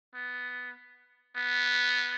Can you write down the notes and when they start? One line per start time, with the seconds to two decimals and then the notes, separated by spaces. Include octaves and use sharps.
0.15 B3
1.36 B3